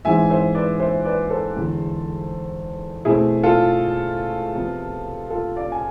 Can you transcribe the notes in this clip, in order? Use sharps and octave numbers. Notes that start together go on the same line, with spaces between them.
G#2 E3 G#3 C4 E5 G#5
C5 E5
B4 D5
C5 E5
B4 D5
A4 C5
E2 D3 G#3
B2 A3 C4 E4 G#4
F4 A4
C3 F3 B3
F4 A4
D5 F5
G#5